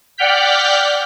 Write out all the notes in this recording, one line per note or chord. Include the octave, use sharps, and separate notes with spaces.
D5 F#5 G5 F6 G6 B6